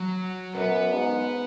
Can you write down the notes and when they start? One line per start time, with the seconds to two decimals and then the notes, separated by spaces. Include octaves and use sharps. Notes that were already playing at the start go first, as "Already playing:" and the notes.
Already playing: F#3
0.55 F#2 B3
0.93 G#2